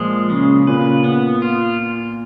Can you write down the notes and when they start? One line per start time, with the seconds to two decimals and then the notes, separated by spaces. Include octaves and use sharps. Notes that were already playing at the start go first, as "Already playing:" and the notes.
Already playing: A#2 F3 G#3
0.30 C#3
0.67 A#2 B4
1.04 B3
1.42 F4